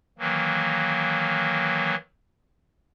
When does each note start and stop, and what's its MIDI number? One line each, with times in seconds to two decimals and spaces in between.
0.19 1.95 51
0.19 1.95 52
0.19 1.95 54
0.19 1.95 58